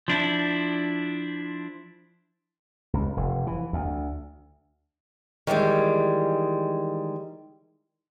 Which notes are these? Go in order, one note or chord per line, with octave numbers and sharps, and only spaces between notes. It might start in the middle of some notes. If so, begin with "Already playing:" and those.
F3 D4 E4
C#2
F1
E3
D2
D#3 E3 G3 G#3